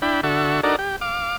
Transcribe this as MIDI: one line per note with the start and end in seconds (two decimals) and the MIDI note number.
0.02 0.21 62
0.02 0.21 64
0.02 0.21 79
0.02 0.21 83
0.23 0.61 50
0.23 0.61 66
0.23 0.61 69
0.23 0.61 76
0.23 0.61 85
0.63 0.76 62
0.63 0.76 63
0.63 0.76 66
0.63 0.76 69
0.63 0.76 70
0.63 0.76 74
0.79 0.96 67
1.01 1.36 77
1.01 1.36 86